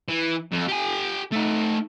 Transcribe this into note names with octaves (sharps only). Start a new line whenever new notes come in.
E3
F2
G4 G#5
A3 D#4